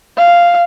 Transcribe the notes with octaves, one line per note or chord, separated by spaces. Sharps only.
F5